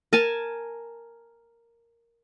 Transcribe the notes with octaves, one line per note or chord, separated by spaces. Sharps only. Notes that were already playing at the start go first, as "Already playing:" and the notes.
A#4 G#5 A5